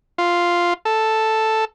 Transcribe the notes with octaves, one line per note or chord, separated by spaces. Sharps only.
F4
A4